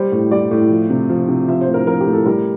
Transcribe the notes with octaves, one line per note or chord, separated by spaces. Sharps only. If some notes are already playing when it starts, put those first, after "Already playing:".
Already playing: G3 C5
A2
G3 D5
A2
F3
C3
F3
C3
F3 E5
C5
A2
A#4
F3 A#4
G4
A2
A4
G3 A#4